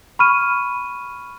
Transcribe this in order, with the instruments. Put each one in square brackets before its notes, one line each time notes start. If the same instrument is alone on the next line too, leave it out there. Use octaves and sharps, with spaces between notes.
[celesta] B5 C#6 F6 D#7